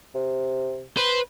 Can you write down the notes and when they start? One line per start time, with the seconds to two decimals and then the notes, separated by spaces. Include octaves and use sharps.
0.15 C3
0.97 B4 C5